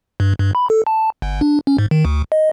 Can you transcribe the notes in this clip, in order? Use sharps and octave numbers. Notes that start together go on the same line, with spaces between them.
G2
G2
B5
A4
A5
G1
D4
C#4
G#2
D#3
D2
D#5